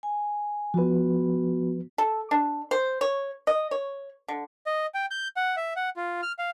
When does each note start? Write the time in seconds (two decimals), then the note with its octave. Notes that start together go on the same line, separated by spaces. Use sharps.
0.03 G#5
0.74 F3 B3 F#4 B4
1.98 A4
2.31 D4
2.71 C5
3.01 C#5
3.47 D#5
3.71 C#5
4.28 D3
4.66 D#5
4.94 G5
5.11 G6
5.36 F#5
5.57 E5
5.76 F#5
5.97 F4
6.22 F6
6.39 F5